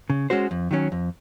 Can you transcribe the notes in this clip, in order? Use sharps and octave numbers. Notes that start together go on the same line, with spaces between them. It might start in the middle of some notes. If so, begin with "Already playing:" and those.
C#3
G#3 C#4 F#4 C5
F2
D#3 F#3 C#4
F2